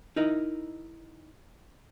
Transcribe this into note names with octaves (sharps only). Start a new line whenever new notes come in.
D#4 E4 A#4 D#5